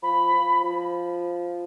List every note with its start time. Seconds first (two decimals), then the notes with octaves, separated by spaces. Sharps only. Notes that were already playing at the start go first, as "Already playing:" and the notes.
0.02 F3 B5
0.33 F3
0.64 F3